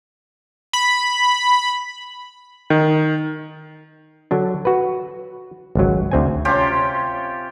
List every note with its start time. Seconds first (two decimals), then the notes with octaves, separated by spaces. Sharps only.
0.73 B5
2.70 D#3
4.31 D3 F#3 D4
4.65 F#4 B4
5.75 G#1 C#2 F#3
6.12 D2 C4 G#5
6.45 C3 C#4 F4 G4